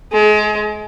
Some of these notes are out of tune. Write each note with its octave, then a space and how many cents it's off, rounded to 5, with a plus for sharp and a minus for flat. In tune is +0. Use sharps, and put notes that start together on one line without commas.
G#3 +30